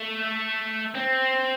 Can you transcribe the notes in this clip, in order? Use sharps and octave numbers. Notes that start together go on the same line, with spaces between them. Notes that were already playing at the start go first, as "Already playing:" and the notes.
Already playing: A3
C4